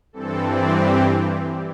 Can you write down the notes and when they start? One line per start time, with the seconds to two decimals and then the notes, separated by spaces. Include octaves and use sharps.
0.13 G2 E3 C4 A4
0.43 D5
0.73 G4